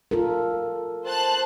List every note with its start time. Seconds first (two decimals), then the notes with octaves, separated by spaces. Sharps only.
0.11 F4 A4 A#4
1.05 C5 A5 F#6